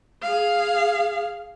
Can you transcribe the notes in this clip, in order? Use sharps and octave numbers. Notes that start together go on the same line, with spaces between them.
G#4 F5